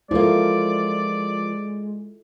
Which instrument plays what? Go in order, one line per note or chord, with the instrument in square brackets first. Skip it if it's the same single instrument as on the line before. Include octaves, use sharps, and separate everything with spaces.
[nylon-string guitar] F3 A#3 [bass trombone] G#3 [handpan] E4 F4 A4 [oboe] D5